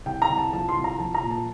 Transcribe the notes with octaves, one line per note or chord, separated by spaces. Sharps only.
C2 G5
A#5
C2
A5
F3 A5
C6
C2
A#5
F3 A5
A#5
A#2
A5